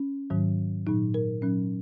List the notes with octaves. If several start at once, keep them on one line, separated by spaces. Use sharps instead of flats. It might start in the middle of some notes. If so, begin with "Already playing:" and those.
Already playing: C#4
G#2 D#3 F#3
A#2 F#3 D#4
A#4
A#2 F#3 C#4